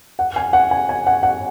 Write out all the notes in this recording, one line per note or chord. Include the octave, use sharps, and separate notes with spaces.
F#5
G#5
F#5
G#5
G#5
F#5
F#5